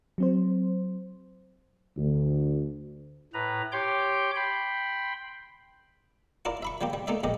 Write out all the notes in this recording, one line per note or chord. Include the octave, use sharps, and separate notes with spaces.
F#3 C4 C5
D2
A2 B4 A#5
G4 C#5 G5 C6 D6 G6
G5 B5 C6
E4 F4 A#4 D5
E5 B5 C#6
F3 G3 A#3 G4
G3
A3 A#3 D#4 D5 E5
A#1 A#2 G4 D#5